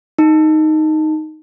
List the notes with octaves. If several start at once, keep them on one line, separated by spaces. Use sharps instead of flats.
D#4